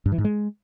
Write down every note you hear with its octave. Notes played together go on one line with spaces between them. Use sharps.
G2
E3
G#2
G#3